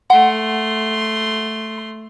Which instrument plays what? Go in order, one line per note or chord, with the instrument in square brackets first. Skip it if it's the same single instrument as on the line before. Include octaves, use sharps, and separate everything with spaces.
[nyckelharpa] A3 C6 [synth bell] F#5